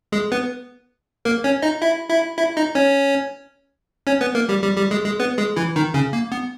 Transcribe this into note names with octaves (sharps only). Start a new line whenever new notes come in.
G#3 G#4
B3 B4
A#3 A#4
C#4 C#5
D#4 D#5
E4 E5
E4 E5
E4 E5
D#4 D#5
C#4 C#5
C#4 C#5
B3 B4
A#3 A#4
G3 G4
G3 G4
G3 G4
G#3 G#4
G#3 G#4
B3 B4
G#3 G#4
E3 E4
D#3 D#4
C#3 C#4
A#3
B3